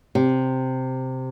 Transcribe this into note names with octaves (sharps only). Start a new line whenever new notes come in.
C3